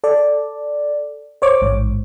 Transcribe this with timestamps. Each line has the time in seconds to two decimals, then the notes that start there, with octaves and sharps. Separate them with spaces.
0.04 A4 D5
1.42 C5 C#5 D6
1.61 A1 G#2